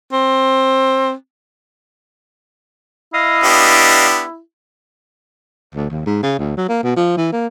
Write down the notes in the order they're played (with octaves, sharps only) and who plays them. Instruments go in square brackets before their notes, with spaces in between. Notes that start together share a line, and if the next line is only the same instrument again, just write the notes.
[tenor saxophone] C4
[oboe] E4 [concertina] D#5 F5 D#6
[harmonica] B3 D4 G4
[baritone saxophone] D2
D#2
G#2
C#3
D2
F#3
A#3
B2
F3
E3
A#3